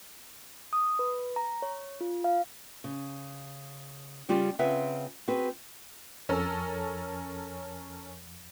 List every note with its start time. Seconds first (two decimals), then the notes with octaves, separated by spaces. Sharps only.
0.73 D#6
0.99 B4
1.36 A#5
1.62 C#5
2.01 F4
2.24 F5
2.84 C#3
4.29 C#3 G3 C#4 F4 G4
4.59 C#3 C4 F4 B4 E5 F#5
5.28 C4 F#4 G#4 B4
6.29 F2 F3 C#4 A4 A#4 E6